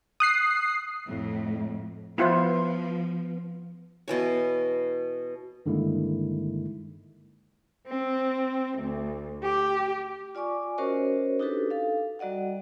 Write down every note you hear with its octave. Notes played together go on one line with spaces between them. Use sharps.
D#6 F#6 C7
F2 A2
F3 B3 E4 F4 C5
B2 E3 C#5
G2 D3 D#3 G#3 A#3 E4
C4
D2
G4
F4 D5 G#5 C#6 D6
C#4 F#4 A#4 C5 C#5 D#5
D4 D#4 F#4 G4 A4 B4
A4 F5
G3 F#4 D5 D#5 F#5